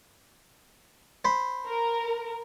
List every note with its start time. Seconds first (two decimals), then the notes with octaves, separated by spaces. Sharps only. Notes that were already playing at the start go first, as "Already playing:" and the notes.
1.25 C5 B5
1.66 A#4